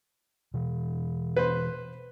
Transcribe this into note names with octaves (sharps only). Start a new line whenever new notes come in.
B2 E3
B4 C5